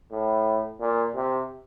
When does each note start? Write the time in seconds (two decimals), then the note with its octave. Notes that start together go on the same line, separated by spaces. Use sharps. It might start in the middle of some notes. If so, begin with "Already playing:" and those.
0.12 A2
0.80 A#2
1.15 C3